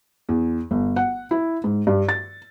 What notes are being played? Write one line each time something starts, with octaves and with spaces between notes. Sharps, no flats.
E2
G1
F#5
E4
G#2
G2
A6